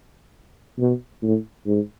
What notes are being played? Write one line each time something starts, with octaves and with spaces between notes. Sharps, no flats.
B2
A2
G#2